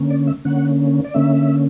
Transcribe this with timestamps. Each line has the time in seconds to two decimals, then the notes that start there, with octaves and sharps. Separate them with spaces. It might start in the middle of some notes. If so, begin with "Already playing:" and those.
Already playing: D3 A#3 C#4
0.10 D5
0.27 E5
0.45 D3 A#3 C#4 F#5
1.04 D5
1.14 D3 A#3 C#4 E5